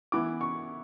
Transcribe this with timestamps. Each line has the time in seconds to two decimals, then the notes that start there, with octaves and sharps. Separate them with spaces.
0.12 E3 B3 E4 D6
0.41 C#6